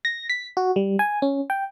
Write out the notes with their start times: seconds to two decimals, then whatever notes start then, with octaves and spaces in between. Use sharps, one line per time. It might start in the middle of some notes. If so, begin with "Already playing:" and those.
0.05 A#6
0.29 B6
0.57 F#4
0.76 G3
0.99 G#5
1.22 C#4
1.50 G5